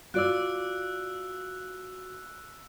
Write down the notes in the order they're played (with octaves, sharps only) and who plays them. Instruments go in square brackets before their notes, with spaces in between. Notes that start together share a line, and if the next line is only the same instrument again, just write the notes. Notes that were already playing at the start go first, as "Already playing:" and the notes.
[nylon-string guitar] F4 D5 [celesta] F#4 D7 [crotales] E6 F#6